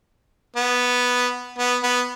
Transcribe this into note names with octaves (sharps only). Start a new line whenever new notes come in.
B3
B3
B3